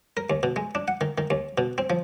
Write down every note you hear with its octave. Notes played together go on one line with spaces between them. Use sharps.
A#4
D#2
B2
G#3
D4
F#5
D#3
D#3
D#2
B2
C4
F3